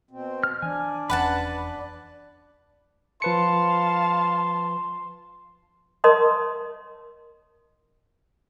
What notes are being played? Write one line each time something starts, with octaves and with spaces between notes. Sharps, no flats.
B2 C4
F6
E3 D4 G#5
F1 E2 C#4 B4 F#5 A5 B5
F3 B4 F5 A5 C6 C#7
A#4 C#5 D#5 A5 C6 D#6